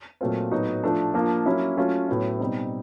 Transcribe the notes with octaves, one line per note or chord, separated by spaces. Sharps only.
A#2 F#3 A3 C4 F4
A2 F#3 B3 D#4 F#4
F3 A3 D4
F3 A#3 D4 F4
F#3 A#3 C#4 E4
F#3 A3 C#4 F4
A2 F#3 B3 E4
B2 G3 C4 D#4